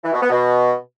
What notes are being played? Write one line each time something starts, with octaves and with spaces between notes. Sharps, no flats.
E3
B2
B3
B2